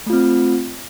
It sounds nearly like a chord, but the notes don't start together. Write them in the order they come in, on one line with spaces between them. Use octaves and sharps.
A3 F4 C4